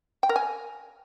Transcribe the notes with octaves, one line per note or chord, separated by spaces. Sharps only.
G5
A#4
G#5